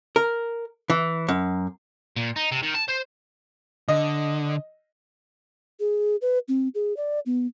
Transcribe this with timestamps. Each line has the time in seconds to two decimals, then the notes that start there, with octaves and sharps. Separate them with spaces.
0.16 A#4
0.90 E3
1.28 F#2
2.16 A#2
2.36 D#4
2.52 C3
2.63 D#3
2.74 A5
2.88 C5
3.88 D3 D#5
5.80 G#4
6.22 B4
6.48 C4
6.75 G#4
6.97 D5
7.26 B3